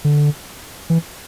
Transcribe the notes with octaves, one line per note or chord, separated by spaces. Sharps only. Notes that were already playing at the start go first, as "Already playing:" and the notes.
D3
E3